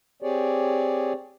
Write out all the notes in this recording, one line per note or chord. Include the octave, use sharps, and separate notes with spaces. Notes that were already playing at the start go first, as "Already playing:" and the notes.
C4 G4 G#4 C#5 D5